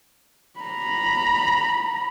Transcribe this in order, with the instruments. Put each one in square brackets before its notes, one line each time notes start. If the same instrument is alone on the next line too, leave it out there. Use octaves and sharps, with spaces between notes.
[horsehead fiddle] A#5 B5